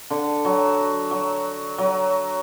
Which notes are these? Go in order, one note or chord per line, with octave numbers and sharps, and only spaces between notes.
D3
F#3
F#3
F#3